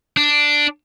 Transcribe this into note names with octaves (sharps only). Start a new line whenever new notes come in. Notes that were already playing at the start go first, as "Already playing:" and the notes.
D4